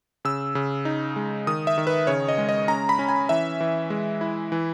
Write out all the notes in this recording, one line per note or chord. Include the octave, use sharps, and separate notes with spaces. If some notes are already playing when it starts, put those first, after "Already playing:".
C#3 E6
C#3
D#4
G#3
D#3 D#6
E5
D#3
B4
C#3 C#5
D#5
G#3
D#5
C#4 A#5
B5
C#4
G#5
E3 E5
E3
G#3
E4
E3